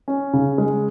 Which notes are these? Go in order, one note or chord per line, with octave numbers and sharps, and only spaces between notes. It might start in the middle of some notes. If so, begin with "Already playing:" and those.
C#4
C#3
G#3